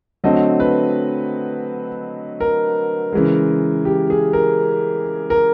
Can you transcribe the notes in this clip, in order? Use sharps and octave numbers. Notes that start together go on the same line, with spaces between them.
D3 F#3 A3 C4 D#5
B4
A#4
C#3 E3 G#3
G4
G#4
A#4
A#4